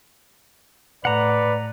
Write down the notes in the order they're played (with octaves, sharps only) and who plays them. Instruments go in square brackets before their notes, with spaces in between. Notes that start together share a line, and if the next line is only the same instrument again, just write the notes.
[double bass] A2 [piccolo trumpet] B4 [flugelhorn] D5 [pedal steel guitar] F#5 A#5